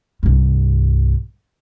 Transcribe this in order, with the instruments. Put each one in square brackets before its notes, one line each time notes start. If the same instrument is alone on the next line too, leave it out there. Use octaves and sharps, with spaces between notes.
[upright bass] C2 G2